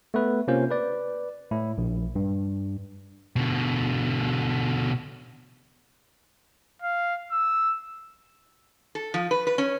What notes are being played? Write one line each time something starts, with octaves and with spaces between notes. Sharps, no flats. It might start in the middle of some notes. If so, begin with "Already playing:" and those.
A3 B3 B4
C3 A#3 C#4 F4 C5
B4 D5
A2 E4
A#1
G2
B2 D3
F5
E6
A4
F3
B4
B4
C#4